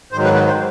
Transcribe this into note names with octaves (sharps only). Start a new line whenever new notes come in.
G#2 D#3 F#3 C5
B4
B4
C5